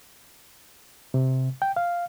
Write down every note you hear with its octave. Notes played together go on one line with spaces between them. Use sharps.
C3
G5
F5